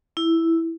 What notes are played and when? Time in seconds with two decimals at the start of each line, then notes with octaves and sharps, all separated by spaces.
0.17 E4